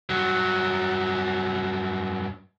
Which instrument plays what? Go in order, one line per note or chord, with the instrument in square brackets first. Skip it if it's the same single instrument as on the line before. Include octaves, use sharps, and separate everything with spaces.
[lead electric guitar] G2 F#3